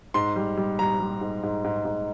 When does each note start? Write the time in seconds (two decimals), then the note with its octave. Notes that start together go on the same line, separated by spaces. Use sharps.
0.14 G#2 C6
0.36 G3
0.57 G3
0.79 G3 A#5
1.00 G3
1.21 G#2
1.43 G#2
1.64 G#2
1.85 G#2